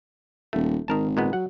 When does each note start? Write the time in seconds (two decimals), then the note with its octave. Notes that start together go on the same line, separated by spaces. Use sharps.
0.53 D#1 A3
0.88 G#1 D#3 A#4 A5
1.17 A#2 G#3 B3
1.33 F#3 F#5